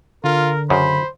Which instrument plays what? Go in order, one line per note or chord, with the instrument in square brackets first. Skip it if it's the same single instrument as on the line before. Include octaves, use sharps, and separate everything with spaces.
[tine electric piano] D3 [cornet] F4 [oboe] A#4
[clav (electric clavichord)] F#2 C#3 [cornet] C5 [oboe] B5